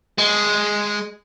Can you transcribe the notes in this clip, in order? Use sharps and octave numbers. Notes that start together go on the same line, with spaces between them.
G#3